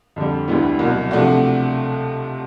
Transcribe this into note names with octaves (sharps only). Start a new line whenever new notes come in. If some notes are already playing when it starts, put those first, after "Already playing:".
F2 D3 G3
D2 D3 G3 B3 E4
C2 B2 F#3
C3 F3 A3 D4 F#4